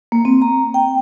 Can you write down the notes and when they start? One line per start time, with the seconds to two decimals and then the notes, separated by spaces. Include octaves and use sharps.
0.12 A#3
0.25 C4
0.42 A#5
0.74 G5